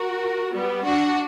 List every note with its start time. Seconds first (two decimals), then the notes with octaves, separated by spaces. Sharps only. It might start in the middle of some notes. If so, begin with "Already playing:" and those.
Already playing: F#4 A#4
0.54 G3 B3
0.84 D4 F#4